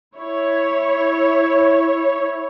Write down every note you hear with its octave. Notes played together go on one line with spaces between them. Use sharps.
E4 C#5